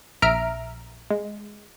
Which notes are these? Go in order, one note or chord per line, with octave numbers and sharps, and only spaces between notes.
A#1 E5 A#5 F6 D7
G#3